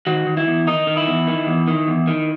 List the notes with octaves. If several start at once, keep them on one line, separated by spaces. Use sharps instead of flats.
D#3 F#4
D#3
E4
E2
D#3 D#4
D#3
E4
E2
D#3
E2
D#3
E2
D#3